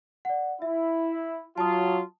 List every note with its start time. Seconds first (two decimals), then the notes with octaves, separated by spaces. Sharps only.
0.25 D5 F#5
0.62 E4 E5
1.58 F#3 F4 A5 D#6